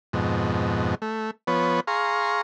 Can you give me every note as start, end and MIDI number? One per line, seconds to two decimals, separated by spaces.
0.13 0.95 41
0.13 0.95 44
0.13 0.95 47
1.02 1.31 57
1.47 1.80 53
1.47 1.80 59
1.47 1.80 71
1.47 1.80 73
1.87 2.41 68
1.87 2.41 77
1.87 2.41 82
1.87 2.41 84
1.87 2.41 85